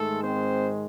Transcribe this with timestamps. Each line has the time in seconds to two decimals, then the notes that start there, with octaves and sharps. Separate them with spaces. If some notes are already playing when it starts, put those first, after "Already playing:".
Already playing: G#2 D#3 G#3 A3 A4
0.23 C4 C5